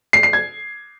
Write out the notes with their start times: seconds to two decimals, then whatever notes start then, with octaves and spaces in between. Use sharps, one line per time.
0.13 C7
0.23 C7
0.33 G#6